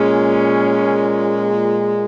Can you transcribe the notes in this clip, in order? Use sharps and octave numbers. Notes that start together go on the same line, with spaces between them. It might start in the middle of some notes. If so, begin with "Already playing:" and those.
Already playing: A#2 G#3 C#4